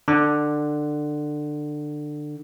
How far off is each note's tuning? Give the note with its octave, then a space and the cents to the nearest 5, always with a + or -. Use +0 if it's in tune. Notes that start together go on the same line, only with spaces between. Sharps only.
D3 +20